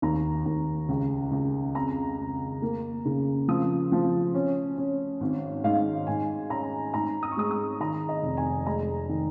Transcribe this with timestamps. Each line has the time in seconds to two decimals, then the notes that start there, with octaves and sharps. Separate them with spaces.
0.02 D#2 A#5
0.46 D#2
0.89 C#2
1.32 C#2
1.75 F2 A#5
2.18 F2
2.62 A#3
3.06 C#3
3.48 F3 D#6
3.92 F3
4.34 C#4
4.78 C#4
5.21 G#1
5.64 G#2 F5
6.07 G#2 G#5
6.50 C#4 A#5
6.94 G#2 A#5
7.23 D#6
7.31 C#6
7.37 G#3 D#6
7.51 D#6
7.80 D#3 A#5
8.09 D#5
8.23 F1
8.37 G#5
8.66 G#3 A#5
9.09 D#3